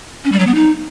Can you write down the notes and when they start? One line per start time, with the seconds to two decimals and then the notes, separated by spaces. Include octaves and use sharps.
0.24 C#4
0.32 G3
0.40 F#3
0.47 B3
0.55 D#4